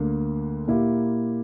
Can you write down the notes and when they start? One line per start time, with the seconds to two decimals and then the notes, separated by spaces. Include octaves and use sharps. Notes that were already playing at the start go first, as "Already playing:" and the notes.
Already playing: D2 D3 A#3
0.68 A#2 A#3 E4 G4